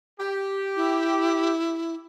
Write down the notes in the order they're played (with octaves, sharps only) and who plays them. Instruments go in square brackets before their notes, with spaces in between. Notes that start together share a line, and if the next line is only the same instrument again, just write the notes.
[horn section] G4
[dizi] E4